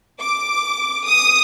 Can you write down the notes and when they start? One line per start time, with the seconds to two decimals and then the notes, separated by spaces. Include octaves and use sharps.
0.20 D6
1.05 D#6